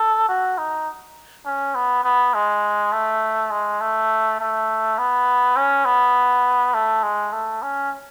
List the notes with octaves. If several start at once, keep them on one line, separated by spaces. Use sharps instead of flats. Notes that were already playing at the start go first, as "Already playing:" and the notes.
Already playing: A4
F#4
D#4
C#4
B3
B3
G#3
A3
G#3
A3
A3
B3
C#4
B3
A3
G#3
A3
C#4